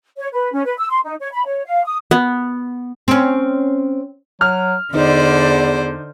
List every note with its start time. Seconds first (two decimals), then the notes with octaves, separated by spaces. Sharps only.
0.18 C#5
0.32 B4
0.52 C#4
0.65 B4
0.78 E6
0.90 C6
1.04 D#4
1.20 C#5
1.33 B5
1.45 C#5
1.65 F5
1.84 D#6
2.11 B3
3.08 C4 C#4
4.41 F#3 F6
4.94 E2 D3 D#4 C5 D5